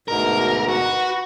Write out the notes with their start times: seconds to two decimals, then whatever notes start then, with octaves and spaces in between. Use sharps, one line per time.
0.08 D2 G#2 B2 A#4
0.68 F#4
0.84 B4